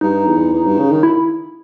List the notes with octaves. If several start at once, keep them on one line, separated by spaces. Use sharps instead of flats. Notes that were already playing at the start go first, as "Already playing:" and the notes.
G2 D#4
E2
E2
G2
C#3
D#3
E4